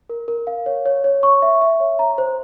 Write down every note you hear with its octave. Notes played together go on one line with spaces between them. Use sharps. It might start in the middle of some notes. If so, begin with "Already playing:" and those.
A#4
A#4
F5
C#5
C#5
C#5
C#6
E5
E5
C#5
A#5
C5